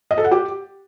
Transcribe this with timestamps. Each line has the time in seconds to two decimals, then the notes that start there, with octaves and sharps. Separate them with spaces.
0.11 D#5
0.18 A4
0.24 F#5
0.31 G4